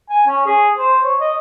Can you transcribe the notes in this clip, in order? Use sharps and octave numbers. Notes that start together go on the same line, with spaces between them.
G#5
C#4
G#4
C5
C#5
D#5